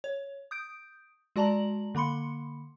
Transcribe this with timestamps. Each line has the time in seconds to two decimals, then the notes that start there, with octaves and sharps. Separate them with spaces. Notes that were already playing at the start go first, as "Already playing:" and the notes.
0.04 C#5
0.51 D#6 G6 D7
1.36 G#3 F#4 D5 A5 A#5 F#7
1.95 D3 A#3 B5 C6 C#7